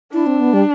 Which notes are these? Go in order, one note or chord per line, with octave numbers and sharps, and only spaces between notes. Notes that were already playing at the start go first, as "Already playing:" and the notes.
D4 E4
C4
B3
G3